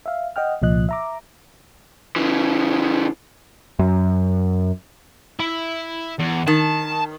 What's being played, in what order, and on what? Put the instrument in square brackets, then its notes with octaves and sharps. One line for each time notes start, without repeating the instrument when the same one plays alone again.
[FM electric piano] E5 F5
D#5 F#5 G5 F6
C2 A#2 F3 D#5 F#6
E5 A#5 D6
[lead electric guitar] C#3 E3
[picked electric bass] F#2
[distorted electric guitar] E4
E2
[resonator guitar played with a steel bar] D#3 [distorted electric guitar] A5